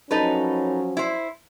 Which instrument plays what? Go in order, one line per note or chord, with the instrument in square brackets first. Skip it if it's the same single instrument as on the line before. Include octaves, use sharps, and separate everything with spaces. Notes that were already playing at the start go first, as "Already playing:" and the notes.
[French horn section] F3 F#3 C#4 [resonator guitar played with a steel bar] D#4 A4 B4
[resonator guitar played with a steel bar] E4 C5